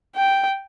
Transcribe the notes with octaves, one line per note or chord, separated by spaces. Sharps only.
G5